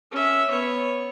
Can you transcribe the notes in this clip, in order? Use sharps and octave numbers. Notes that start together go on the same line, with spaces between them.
C#4 E5
B3 C#5